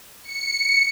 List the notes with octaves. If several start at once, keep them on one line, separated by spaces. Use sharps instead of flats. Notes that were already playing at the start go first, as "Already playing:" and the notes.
C#7